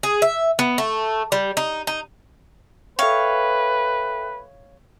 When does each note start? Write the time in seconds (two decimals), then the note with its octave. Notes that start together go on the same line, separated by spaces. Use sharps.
0.03 G#4
0.22 E5
0.59 B3
0.78 A3
1.32 G3
1.57 D#4
1.87 D#4
2.99 A4 B4 C#5 E5 F5 G5